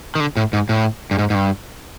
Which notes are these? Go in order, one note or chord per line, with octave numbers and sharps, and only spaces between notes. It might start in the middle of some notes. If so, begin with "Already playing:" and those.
D#3
D3
A2
G#2
A2
G2
G#2
G#2
G2